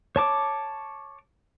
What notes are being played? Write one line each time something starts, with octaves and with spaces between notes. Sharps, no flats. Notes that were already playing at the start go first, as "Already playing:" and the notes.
C#5 A5 D6